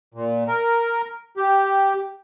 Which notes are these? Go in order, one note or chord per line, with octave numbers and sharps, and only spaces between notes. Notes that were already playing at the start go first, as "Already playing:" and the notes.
A#2
A#4
G4